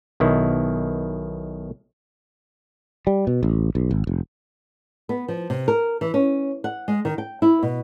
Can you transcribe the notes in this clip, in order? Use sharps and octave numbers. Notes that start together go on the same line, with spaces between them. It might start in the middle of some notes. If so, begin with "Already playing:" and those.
B1 B2 D#3 E4
G3
B2
A1
B1
G#1
F1
B3
F3
C3
A#4
E3
C#4
F#5
G#3
D#3
G5
E4
B2